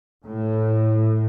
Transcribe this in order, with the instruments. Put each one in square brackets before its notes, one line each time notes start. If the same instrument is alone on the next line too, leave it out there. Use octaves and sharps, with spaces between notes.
[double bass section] A2